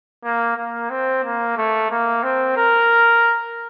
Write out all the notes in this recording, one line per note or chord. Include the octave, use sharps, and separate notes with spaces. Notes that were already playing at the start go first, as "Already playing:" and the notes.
A#3
A#3
C4
A#3
A3
A#3
C4
A#4